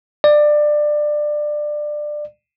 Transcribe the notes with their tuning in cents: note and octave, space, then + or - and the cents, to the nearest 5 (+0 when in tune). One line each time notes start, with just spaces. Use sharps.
D5 +20